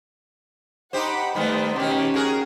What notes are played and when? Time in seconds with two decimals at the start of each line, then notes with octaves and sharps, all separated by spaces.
0.93 D#4 G4 C5 F#5 B5
1.35 D#3 G3 A3 B3 B4 C5
1.76 B2 D#3 C#4 G4
2.14 F#4 G#4 A#4